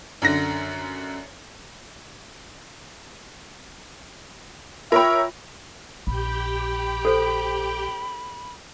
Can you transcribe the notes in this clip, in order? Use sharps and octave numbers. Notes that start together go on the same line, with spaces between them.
F#2 D3 A#6
F4 A#4 C#5 E5 G5 B5
A#1 G4 G5 B5
A4 C5